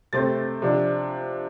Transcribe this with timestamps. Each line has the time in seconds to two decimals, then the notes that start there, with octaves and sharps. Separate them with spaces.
0.13 C3 A3 C4 A6
0.62 C3 F3 D4